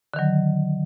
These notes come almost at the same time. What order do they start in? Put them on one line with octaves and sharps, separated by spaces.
D3 D#3 F#3